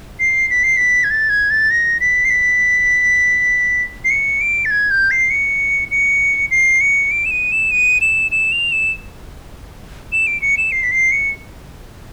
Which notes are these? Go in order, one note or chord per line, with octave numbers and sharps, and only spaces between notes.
C7
B6
C7
B6
G#6
A6
G#6
A6
A#6
B6
C7
B6
C7
C#7
D7
A6
G#6
G6
C7
C#7
C#7
C7
C#7
D7
E7
D#7
E7
D#7
E7
E7
F7
E7
E7
D7
C#7
E7
C7
B6
C7
C#7